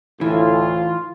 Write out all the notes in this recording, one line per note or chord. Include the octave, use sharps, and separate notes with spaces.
D2 A2 E3 F4